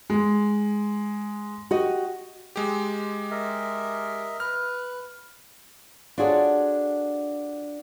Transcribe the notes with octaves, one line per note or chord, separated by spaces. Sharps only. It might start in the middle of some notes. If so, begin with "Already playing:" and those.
G#3
F#4 G4 D#5
G#3 G4
A#4 D#5 E5
B4 F6
D4 F4 F#4 G#4 A4 C#5